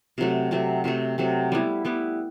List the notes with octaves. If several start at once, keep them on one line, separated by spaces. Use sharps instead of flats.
C3 F#3 A3
C3 F#3 A3
C3 F#3 A3
C3 F#3 A3
G3 B3 E4
G3 B3 E4